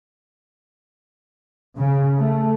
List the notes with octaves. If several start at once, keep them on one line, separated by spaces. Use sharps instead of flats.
C#3
A3